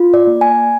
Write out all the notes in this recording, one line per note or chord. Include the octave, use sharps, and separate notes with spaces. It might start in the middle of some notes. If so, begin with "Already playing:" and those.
Already playing: F4
D5
A#3
G#5